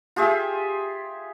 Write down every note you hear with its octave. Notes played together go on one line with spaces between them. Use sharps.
F4 G4 G#4 E5